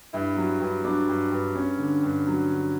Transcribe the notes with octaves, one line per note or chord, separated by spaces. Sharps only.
G2 E4
F#3
G2
F#3 D4
G2
G2
G2 C#4
D3
G2
F#3
D3